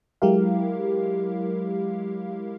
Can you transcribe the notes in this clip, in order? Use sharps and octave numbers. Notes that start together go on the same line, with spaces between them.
F#3 G#3 E4 G4 A#4 F5